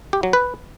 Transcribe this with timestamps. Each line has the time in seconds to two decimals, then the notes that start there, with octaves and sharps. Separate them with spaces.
0.13 G4
0.23 F#3
0.33 B4